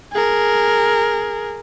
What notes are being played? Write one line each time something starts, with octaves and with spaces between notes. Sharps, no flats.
G#4 A#4